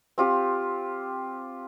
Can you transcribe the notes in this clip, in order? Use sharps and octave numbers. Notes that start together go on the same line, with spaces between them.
C4 F4 G4